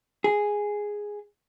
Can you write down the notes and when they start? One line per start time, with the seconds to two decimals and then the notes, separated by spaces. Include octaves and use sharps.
0.24 G#4